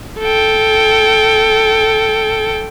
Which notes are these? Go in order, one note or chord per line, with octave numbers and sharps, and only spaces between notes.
A4 G5